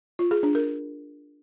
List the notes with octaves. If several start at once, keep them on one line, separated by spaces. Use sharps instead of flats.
F4
G#4
D4
A#4